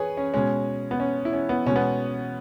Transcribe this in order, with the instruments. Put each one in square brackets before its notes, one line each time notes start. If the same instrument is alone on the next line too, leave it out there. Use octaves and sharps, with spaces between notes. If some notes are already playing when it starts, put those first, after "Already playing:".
Already playing: [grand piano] G#4 B4 C#5
C#4
B2 G#3 C#4
B3
C#4
E4
C#4
B3
B2 G#3 C#4
B3